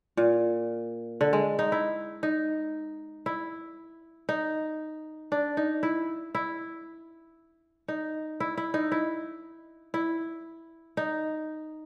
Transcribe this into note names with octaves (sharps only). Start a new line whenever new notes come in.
A#2
D3
G#3
D#4
E4
D#4
E4
D#4
D4
D#4
E4
E4
D#4
E4
E4
D#4
E4
E4
D#4